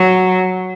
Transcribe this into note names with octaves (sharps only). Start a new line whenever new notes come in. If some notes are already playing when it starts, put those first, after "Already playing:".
Already playing: F#3